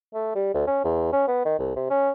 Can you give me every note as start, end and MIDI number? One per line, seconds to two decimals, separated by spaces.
0.14 0.32 57
0.35 0.50 55
0.54 0.64 38
0.67 0.81 61
0.84 1.11 40
1.12 1.26 61
1.27 1.45 59
1.45 1.55 51
1.59 1.72 36
1.76 1.87 48
1.90 2.10 61